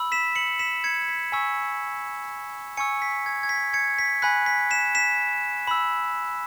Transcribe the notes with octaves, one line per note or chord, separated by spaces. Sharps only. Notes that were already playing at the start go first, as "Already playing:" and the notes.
Already playing: B5 E6
B6 E7
C#7 F#7
B6 E7
G#6 C#7
B6
G#5 C#6 E6 B6
G#5 C#6 E6 G#6 C#7
B6
G#6
G#6
B6
G#6 C#7
B6
G#5 B5 F#6 B6
B6
B6 E7
B6 E7
B5 E6